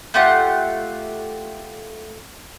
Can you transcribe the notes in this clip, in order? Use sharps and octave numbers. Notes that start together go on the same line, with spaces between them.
A3 F4 G4 F#5